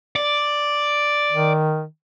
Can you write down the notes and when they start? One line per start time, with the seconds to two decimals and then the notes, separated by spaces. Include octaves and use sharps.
0.16 D5
1.31 D#3